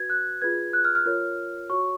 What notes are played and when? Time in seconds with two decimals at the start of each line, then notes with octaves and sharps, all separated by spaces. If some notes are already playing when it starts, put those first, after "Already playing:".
Already playing: F#4 B4 G#6
0.10 F#6
0.42 F4 G#4 B4 G#6
0.73 F#6
0.85 F6
0.95 F6
1.06 F4 A#4 C#5
1.70 F#4 C#5 C#6